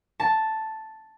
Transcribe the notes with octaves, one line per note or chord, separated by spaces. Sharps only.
A5